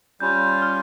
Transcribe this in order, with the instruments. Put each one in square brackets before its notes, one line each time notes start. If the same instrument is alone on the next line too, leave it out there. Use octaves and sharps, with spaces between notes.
[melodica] G3 C#4 F4 [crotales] G6
[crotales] F6